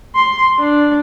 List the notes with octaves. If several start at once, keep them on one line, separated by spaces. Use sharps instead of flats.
C6
D4